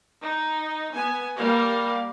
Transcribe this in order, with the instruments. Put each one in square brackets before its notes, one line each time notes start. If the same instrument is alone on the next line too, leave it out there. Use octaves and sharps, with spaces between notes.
[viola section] D#4
B3 G#5
G3 A#3 F5